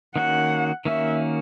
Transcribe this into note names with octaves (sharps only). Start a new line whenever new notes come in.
D#3 A#3 C#4 F#4 F#5
D#3 A#3 C#4 F#4 E5